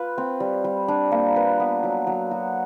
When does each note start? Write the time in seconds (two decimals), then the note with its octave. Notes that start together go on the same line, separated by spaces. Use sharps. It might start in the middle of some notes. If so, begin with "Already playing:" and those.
Already playing: F4 B4
0.18 C4
0.40 G3
0.64 G3
0.88 D4
1.12 A#3
1.36 B4
1.60 B3
1.84 F#3
2.07 F#3
2.31 F#4